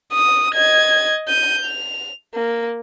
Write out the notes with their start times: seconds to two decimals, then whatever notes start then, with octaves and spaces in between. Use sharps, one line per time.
0.13 D#6
0.55 D#5 G#6
1.29 G6 D#7
1.65 F7
2.35 A#3